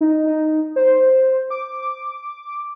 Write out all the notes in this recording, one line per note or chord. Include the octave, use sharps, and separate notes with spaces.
D#4
D#4
C5
D6